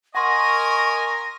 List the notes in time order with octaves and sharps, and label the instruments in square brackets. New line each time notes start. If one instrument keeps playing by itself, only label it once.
[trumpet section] A#4 D#5 G#5 [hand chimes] F#5 C6 [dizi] C#6 [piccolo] A#6